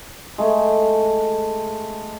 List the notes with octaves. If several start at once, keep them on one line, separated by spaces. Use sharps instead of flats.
G#3 A3